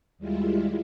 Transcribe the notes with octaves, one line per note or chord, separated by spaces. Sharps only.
D#2 G3 G#3 E4 F4